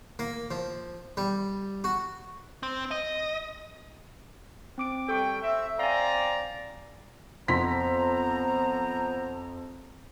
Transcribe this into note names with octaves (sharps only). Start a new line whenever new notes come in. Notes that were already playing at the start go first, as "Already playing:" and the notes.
A#3
F3
G3
F#4
C4
D#5
C4 D6 D7
G3 A4 G5 C#6
C4 E5
C4 D5 F5 G#5 A#5
F2 B3 C5 A#5 C6 B6